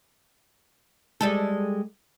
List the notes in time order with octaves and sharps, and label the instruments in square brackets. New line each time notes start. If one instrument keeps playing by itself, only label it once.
[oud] G3 G#3 A4